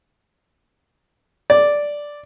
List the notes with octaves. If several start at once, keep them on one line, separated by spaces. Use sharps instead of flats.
D5